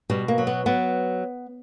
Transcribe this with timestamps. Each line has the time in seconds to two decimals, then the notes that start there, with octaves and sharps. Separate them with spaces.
0.10 B2 G3
0.28 A#3
0.38 F#3
0.47 B3
0.66 F#3 B3